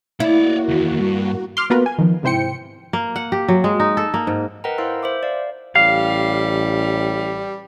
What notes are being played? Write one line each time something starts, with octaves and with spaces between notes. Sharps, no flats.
A#3 E4 F#4 C#5 D5
E2 D#3
G2
C6 D6 F6
A#3 B3 F4 F#4 A#4 B4
G#5
D#3 F3
G#2 C3 E4 C5 G5 C#7
A#3
F#5
G4
F#3
G#3
D#4
A4
A#3
G#2
A#4 B4 D#5 F#5 G5 A#5
E4 A#4 C5 F5 C6 E6
C5 E5 D6
D5 F5
A1 G3 F5